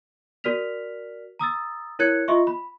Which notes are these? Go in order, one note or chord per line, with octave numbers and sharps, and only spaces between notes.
F#4 A#4 D5 F6 B6 F7
A#5 D#6 E6 A6
E4 A#4 C#5 F#6 G#6 C#7
F4 D#5 E5 C6 C#6
B5